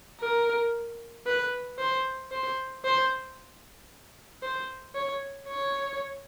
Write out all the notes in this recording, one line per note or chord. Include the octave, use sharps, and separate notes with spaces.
A#4
B4
C5
C5
C5
C5
C#5
C#5